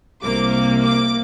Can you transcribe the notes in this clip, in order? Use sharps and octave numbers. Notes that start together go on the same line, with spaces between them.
C2 C3 A#3 D6
D6
D6